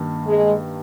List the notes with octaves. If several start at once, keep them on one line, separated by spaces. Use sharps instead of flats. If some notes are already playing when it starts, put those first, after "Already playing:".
Already playing: G2 D#3 A#3
G#3